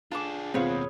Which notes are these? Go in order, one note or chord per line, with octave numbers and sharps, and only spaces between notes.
D4 F4 G#4 A5 D6
D#2 B2 C4 F4 G#4 B4 C#5